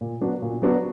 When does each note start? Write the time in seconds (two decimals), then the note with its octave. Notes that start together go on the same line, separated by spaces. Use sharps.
0.01 A#2
0.21 F#3 B3 D4 F#4
0.42 A#2
0.62 F#3 B3 D4 F#4